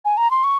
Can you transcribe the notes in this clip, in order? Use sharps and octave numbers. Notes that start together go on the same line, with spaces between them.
G#5
A#5
C6
C#6